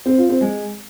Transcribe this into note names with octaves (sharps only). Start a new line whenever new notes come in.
C4
F4
C4
G#3